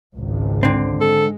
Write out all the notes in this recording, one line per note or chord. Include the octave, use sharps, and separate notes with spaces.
G#1 C#2
D3 C4
G#3 A4